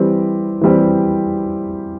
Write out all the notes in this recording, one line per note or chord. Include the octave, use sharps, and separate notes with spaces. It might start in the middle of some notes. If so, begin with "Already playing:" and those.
Already playing: E3 G3 C4 G4
E3 G3 C4 G4